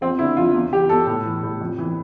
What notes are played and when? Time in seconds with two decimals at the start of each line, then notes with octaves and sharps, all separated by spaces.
0.01 F2 C4
0.19 D3 E4
0.37 F2 F4
0.54 E2
0.72 E3 G4
0.89 E2 A4
1.07 A2 A4
1.25 E3
1.43 A2
1.61 F2
1.79 E3